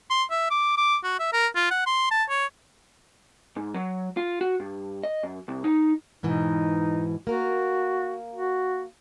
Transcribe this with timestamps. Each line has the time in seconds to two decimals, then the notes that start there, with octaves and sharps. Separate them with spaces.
0.10 C6
0.31 E5
0.51 D6
0.77 D6
1.03 F#4
1.20 E5
1.33 A#4
1.55 F4
1.71 F#5
1.86 C6
2.11 A5
2.29 C#5
3.56 G#2
3.74 F#3
4.17 F4
4.41 F#4
4.60 G2
5.03 D#5
5.23 F#2
5.48 C2
5.64 D#4
6.23 G#2 B2 E3 D#4
7.27 A#3 F#4 A#4
8.35 F#4